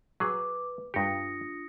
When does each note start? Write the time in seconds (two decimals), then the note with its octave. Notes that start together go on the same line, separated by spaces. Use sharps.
0.20 F#3 G#4 B4 D6
0.94 G2 D4 F4 G4 D#6 A#6 C#7